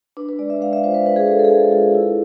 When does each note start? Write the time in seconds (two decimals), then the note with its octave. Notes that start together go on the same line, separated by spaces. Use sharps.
0.17 D4 B4
0.29 B4
0.39 G#3 D5
0.50 E5
0.61 G#3 F5
0.73 E5
0.84 F4 C5
0.94 B4
1.06 D4 B4
1.16 G#4
1.28 G#3 A4
1.39 A4
1.45 G#4
1.50 G#3 A4
1.72 F4
1.95 E4